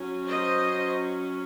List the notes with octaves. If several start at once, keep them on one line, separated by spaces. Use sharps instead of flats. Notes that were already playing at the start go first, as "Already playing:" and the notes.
Already playing: F#3 C#4
C5 D#5